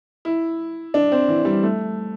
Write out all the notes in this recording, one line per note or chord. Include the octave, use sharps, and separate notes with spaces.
E4
D4
C4
E3
G3
A3